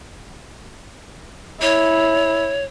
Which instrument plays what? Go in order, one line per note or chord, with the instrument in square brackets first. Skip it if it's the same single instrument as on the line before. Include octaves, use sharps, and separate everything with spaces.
[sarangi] E4 [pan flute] C#5